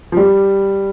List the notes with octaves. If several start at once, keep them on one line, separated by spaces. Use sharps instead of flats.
F3
G3